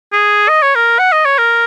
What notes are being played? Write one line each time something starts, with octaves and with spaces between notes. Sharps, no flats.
G#4
D#5
C#5
A#4
F#5
D#5
C#5
A#4